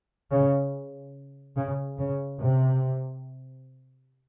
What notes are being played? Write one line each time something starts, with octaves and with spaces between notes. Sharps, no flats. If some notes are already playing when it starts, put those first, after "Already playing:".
C#3
C#3
C#3
C3